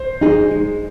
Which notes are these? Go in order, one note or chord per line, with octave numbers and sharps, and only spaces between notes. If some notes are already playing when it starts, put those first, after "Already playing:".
Already playing: C5
D#4 G#4
G#3